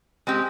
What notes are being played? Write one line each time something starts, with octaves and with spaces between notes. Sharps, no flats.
G#3 C4 G4